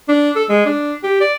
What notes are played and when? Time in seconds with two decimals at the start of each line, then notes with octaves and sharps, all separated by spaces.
0.09 D4
0.36 A4
0.49 G#3
0.66 D4
1.04 G4
1.21 D5